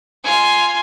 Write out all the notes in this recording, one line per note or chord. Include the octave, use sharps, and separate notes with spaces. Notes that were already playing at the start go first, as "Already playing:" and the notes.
F4 G#5